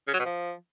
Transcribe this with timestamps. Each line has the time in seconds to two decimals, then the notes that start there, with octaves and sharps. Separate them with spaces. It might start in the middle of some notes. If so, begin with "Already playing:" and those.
0.08 C#3
0.13 F#3
0.19 B2
0.25 F3